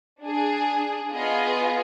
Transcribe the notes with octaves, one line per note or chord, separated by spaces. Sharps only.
D4 G#4
B3 F4 G#4 D#5